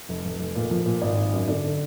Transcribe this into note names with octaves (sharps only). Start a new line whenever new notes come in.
F1
F1
F1
A#2
F3
A#2
G#1 D5
G#1
F#2
D3 D4
D3